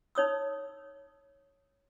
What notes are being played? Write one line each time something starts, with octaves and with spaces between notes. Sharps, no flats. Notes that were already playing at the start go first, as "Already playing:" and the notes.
D#4 C#5 D#6 E6